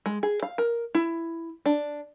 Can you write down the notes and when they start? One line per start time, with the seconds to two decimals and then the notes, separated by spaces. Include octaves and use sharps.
0.06 G#3
0.23 G#4
0.43 F5
0.58 A#4
0.95 E4
1.66 D4